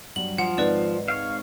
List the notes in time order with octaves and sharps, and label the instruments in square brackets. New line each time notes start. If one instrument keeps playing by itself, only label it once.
[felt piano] G2 F#3 G3 [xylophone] F#7
[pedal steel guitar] F3 [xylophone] F#5
[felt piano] G#1 G#2 [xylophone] B4 D5 E7
[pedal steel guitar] C#5 F5